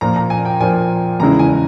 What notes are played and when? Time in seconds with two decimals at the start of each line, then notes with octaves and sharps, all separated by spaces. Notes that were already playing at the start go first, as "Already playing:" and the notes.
0.01 A#2 F3 A#3 A#5
0.16 A#5
0.30 G#5
0.45 G5
0.60 A#2 F3 A#3 G#5
1.20 E2 C#3 E3 G#3 E4 A#5
1.39 G#5